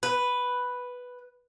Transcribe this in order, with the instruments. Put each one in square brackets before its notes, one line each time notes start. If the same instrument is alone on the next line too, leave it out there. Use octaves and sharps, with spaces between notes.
[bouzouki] B4